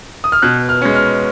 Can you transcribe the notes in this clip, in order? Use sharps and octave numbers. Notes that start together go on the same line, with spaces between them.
D#6
F6
B2 F#6
F6
G#3 C#4
F6